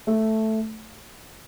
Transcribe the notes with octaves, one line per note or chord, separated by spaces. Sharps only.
A3